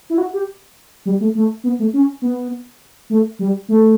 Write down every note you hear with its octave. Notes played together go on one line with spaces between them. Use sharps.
E4
F#4
G4
G3
A3
A3
B3
A3
C#4
B3
A3
G3
A3